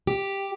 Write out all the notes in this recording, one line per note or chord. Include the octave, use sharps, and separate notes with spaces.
G4